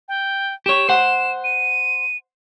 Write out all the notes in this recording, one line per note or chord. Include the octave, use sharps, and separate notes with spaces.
G5
G4 C#5 E7
C5 F#5
D#7